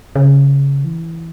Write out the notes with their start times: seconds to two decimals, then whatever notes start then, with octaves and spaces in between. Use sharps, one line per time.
0.16 C#3
0.84 E3